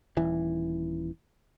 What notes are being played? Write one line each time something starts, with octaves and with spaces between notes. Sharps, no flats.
D#1 E3